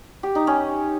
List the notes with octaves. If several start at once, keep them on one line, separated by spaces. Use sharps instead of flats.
G4
D#4
C#4